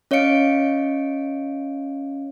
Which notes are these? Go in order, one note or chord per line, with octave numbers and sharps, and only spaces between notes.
C#4 C#5 D#5 F5 C#7 D7